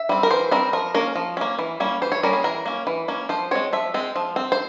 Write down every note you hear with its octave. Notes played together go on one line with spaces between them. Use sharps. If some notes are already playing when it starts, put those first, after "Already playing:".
Already playing: E5
G3 C4
A#4
E3 C5
G3 C4 A#4
F3 A#4
A#3 C#4 A#4
F3
A#3 C#4
E3
G3 A#3 C#4
E3 C5
C#5
G3 A#3 C#4 A#4
G#4
E3 A#4
A#3 C#4
E3
A#3 C#4
F3 C5
G#3 C4 C#5
F3 E5
G#3 C4
F3
C4
C5